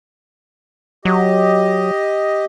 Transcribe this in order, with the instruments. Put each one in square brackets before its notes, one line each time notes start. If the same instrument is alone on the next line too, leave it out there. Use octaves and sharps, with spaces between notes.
[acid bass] F#3 [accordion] G4 D#5